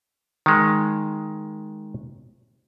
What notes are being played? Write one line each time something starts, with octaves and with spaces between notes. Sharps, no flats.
D#3 G#3